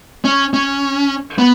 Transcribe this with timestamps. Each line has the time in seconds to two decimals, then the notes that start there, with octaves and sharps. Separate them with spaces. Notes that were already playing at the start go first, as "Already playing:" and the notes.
0.25 C#4
0.54 C#4
1.38 B3